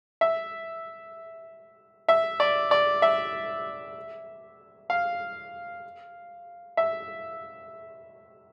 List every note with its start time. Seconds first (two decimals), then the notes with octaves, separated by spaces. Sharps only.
0.21 E5
2.08 E5
2.40 D5
2.71 D5
3.02 E5
4.90 F5
6.77 E5